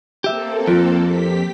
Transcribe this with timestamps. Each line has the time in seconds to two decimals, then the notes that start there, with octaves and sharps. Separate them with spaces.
0.24 A#3 C4 G4 A4 E5
0.67 F2 F4
1.05 G4 B6